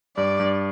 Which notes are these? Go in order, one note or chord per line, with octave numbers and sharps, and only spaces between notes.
G2 D5
G2